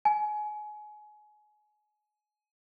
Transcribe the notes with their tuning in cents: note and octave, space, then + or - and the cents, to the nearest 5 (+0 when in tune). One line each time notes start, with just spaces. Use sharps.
G#5 +25